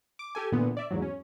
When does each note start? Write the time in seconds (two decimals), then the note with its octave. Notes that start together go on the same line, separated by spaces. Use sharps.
0.19 D6
0.35 G4 A4 G#5
0.52 A#2 D3 E3 B3
0.77 D5 E5
0.91 E2 G#2 F#3
1.02 C#4